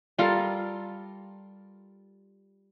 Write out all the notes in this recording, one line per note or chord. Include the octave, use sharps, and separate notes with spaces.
G3 F4 A4 A#4